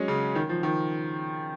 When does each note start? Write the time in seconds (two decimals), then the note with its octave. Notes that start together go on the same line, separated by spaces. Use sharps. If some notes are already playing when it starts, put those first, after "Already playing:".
Already playing: F#3 G#3 C#4
0.08 C#3
0.35 D#3
0.49 F3
0.63 D#3